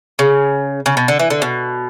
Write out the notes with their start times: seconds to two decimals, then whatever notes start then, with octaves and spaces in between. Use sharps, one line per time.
0.19 C#3
0.86 C#3
0.97 B2
1.08 D3
1.20 E3
1.30 D3
1.42 B2